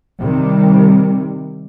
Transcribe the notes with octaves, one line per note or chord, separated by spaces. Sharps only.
C3 D#3 G3